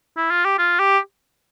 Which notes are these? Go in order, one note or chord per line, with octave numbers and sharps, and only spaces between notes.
E4
F4
G4
F4
G4